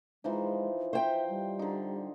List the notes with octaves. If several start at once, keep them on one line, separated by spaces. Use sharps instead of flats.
E3 F3 G#3 D#4
C5 E5 G5
G3
D3 D#4